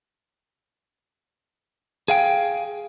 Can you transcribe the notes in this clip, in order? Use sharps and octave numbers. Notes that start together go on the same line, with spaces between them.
G#4 F5 G5